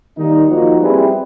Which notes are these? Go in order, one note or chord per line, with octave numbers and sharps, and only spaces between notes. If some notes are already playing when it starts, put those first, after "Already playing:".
D#3 G3 A#3 D#4
F3 A#3 D#4 F#4
G3 C4 E4 G#4 B4